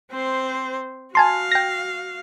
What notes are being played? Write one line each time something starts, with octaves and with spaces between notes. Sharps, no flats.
C4 C5
F#4 F5 G#5 A5 C6
G5 A#6